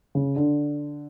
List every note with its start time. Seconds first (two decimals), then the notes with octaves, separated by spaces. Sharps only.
0.15 C#3
0.36 D3